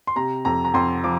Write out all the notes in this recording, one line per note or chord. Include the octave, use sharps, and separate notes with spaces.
C6
C3 A#5
F2 A#5
A#5
F2 C6
F3 D6